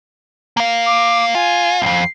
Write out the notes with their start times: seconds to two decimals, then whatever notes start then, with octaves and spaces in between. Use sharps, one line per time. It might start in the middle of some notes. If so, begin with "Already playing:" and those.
0.57 A#3 F5
0.86 D6
1.35 F4 G#5
1.82 B1 F2 C7